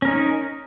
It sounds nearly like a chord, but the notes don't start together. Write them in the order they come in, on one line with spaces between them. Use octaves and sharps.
C#4 A#4 D#4